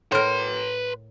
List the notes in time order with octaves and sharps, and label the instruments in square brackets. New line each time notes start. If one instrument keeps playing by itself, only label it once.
[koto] A2 A#4 [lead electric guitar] B4 C6